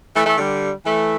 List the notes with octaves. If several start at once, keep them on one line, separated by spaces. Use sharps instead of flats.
E3 A3
E3 A3
D3 G3
E3 A3